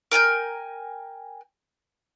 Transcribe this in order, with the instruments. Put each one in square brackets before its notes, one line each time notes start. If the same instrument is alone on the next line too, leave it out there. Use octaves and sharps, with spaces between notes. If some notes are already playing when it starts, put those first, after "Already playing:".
[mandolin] A#4 G5 G#5 G6